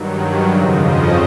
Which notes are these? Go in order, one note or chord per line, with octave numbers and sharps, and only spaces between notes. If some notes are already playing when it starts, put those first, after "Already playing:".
Already playing: G2 D#3 F#3
F2 C#3 F3 D#5
D#5